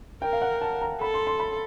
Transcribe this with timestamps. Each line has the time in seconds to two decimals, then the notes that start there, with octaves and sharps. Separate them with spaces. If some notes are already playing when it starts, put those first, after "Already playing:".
0.22 A#4 G5
0.33 F5
0.42 F#5
0.61 A5
0.81 A#5
1.01 A4 B5
1.14 C6
1.27 C6
1.40 B5